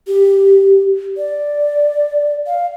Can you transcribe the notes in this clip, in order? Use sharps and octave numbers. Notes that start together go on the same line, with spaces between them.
G4
D5
F5